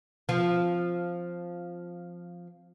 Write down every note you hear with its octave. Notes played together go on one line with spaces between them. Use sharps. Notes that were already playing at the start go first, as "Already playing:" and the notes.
F3 C4